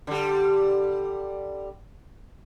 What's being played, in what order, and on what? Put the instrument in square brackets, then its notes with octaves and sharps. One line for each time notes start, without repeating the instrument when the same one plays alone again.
[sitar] D3 G3